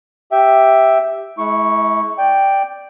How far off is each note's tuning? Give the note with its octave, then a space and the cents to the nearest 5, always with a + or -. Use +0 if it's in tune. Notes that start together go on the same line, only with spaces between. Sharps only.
G4 +0 E5 +0 G5 +0
G#3 +40 E4 -15 C#6 +0
D5 +0 G5 +0